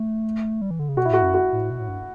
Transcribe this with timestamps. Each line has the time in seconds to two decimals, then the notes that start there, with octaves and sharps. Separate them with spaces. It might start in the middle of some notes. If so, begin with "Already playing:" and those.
Already playing: A3
0.61 G3
0.71 E3
0.79 D3
0.89 C#3
0.97 B2 F#4
1.05 E4
1.10 A2 F#4
1.22 F#2
1.34 F#4
1.53 A2
1.70 B2
1.79 A2
1.88 G2